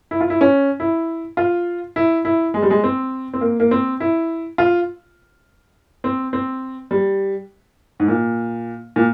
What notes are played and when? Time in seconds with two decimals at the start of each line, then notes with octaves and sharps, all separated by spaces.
0.11 E4
0.21 F4
0.30 E4
0.41 C#4
0.80 E4
1.37 F4
1.96 E4
2.25 E4
2.54 G#3
2.62 G3
2.70 G#3
2.84 C4
3.33 C4
3.41 A#3
3.60 A#3
3.71 C4
4.00 E4
4.58 F4
6.04 C4
6.33 C4
6.91 G3
8.00 G#2
8.08 A#2
8.96 A#2